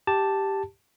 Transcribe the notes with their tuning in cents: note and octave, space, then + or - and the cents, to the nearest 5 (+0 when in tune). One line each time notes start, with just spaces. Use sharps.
G4 +0 A5 +0